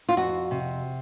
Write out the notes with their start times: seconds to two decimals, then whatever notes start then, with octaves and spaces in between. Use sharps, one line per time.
0.09 F4
0.17 F2 F#4
0.51 C3